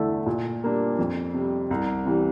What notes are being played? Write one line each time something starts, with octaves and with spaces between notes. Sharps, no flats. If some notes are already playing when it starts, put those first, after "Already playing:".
Already playing: E2 D3 A3 E4 A4
A#2
G3 A#3 D4
F2
C3 G3
C2
C3 E3 G3